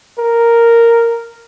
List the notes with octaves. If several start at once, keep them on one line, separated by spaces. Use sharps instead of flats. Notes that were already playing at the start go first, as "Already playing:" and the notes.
A#4